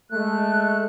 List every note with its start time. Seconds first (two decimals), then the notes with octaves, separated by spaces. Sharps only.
0.11 G#3 A3 F#6